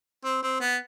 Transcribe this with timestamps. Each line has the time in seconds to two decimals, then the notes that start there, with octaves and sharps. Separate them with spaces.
0.24 C4
0.42 C4
0.60 B3